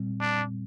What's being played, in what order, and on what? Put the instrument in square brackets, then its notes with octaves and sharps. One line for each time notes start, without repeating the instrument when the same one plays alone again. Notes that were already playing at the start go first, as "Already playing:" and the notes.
Already playing: [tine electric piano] A#2 G3 C4
[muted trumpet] D4